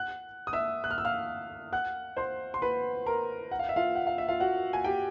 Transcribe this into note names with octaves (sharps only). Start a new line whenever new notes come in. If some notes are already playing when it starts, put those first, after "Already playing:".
Already playing: F#5 F#6
D#6
E5 E6
F#6
F6
E6
F5 F6
F#5 F#6
C5 C6
C6
B4 B5
A#4 A#5
F#5
F5
E5
F4 F5
F#5
F5
E5
F4 F5
F#4 F#5
G#5
G4 G5